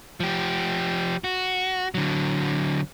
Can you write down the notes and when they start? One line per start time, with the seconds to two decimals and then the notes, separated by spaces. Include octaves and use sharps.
0.20 F3 G4
1.24 F#4
1.94 D3 F#3